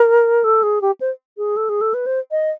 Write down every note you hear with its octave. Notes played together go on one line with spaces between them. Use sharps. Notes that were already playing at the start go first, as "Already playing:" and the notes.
Already playing: A#4
A4
G#4
G4
C5
G#4
A4
G#4
A4
B4
C5
D#5